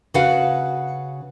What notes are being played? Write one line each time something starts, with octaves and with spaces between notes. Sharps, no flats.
C#3 F#4 B4 F5 F#5